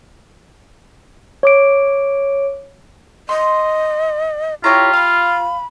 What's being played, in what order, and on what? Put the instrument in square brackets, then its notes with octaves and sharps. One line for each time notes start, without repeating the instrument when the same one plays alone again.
[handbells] C#5 D6 D7
[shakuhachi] D#5 [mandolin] C6
[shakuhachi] E4 [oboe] F4 [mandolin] G4 C#5 A#5
[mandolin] F5 [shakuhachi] B5